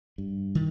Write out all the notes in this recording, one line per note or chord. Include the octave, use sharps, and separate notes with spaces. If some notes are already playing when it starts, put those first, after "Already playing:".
G2
D#3